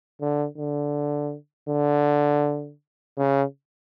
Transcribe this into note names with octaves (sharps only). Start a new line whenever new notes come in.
D3
D3
D3
C#3